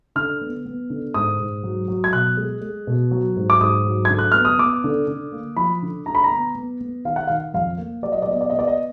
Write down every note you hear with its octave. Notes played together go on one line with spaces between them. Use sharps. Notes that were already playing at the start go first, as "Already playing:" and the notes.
D3 F6
B3
B3
D3
G#2 D#6
G#2
F#3
F#3
G#6
B2 F#6
G#3
G#3
B2
F#3
G#2
D6
G#2 D#6
F#3
D3 G#6
F#6
B3 F6
D#6
B3 D6
D3
D3
A#3
F3 B5
D3
D3 A#5
B5
A#5
B3
B3
B3
D#3 F5
F#5
D#3 F5
F2 F5
A#3
F#3 D5
D#5
D5
B3 D#5
D5
B3 D#5
D5
D#5